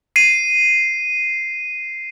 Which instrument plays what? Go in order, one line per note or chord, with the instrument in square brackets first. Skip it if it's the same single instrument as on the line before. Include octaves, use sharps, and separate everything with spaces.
[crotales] C7 D#7